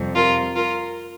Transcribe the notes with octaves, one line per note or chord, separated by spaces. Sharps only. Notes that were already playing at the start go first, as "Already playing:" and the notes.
Already playing: F2 C3 G3
F4 A#4
F4 A#4